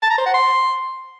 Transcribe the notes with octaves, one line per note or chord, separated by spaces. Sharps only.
A5
A#5
C5
F#5
C6